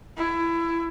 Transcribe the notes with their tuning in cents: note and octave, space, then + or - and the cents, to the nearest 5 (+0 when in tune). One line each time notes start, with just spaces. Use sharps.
E4 +20